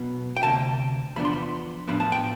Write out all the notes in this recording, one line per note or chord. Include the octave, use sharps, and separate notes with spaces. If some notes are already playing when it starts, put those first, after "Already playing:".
Already playing: B1 B2 B3
G5
D2 C3 A5
E2 C3 F3 B3 D4 B5
C6
B5
A2 F3 B3 D4 B5
A5
G5